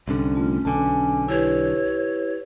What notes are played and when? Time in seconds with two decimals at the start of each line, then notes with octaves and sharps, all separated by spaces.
0.08 C2 G2 D3 C#4
0.35 A3 F4
0.65 B1 D3 D4 G#5 A5
1.28 E4 G4 B4 C#5